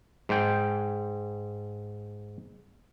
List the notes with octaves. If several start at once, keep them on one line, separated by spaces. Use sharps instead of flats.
G#2 G5